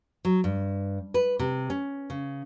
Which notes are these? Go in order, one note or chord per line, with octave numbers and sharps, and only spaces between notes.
F#3
G2
B4
C3
C#4
C#3